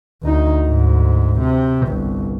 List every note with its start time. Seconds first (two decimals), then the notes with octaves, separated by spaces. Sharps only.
0.23 D2 D#4
0.67 D2 G#2
1.40 C3
1.87 G1 C2